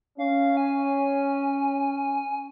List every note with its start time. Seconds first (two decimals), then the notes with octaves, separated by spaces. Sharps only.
0.18 C#4 F5
0.57 G#5